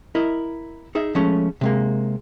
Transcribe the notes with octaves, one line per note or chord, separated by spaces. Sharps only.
E4 A#4 D#5
D#4 G#4 E5
F3 G#3 A3 C#4
C3 G#3 A#3